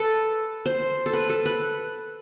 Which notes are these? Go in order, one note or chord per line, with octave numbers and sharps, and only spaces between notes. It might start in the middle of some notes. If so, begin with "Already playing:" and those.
Already playing: A4 B4
C5
A4
B4
A4
B4